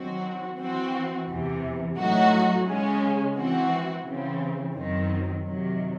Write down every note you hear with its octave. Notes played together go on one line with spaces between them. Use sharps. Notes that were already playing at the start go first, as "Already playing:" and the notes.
Already playing: D#3 F#3 C4 F#4
E3 C4 F#4
E2 C3 E3
A2 F#3 A3 D#4 F#4
C#3 G#3 C#4
E3 C4 F#4
C#3 E3 C4
F#2 D#3 F#3 C4
C3 D#3 F#3